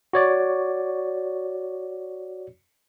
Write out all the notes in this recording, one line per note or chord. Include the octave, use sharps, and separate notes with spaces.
F#4 C#5 D5